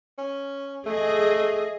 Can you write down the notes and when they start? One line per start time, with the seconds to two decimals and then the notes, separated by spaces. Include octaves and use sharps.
0.18 C#4
0.86 A3 G#4 D#5